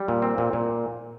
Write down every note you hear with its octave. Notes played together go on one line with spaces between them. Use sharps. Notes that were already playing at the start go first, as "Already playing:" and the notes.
Already playing: G3
A#2
C4
A#2
A#2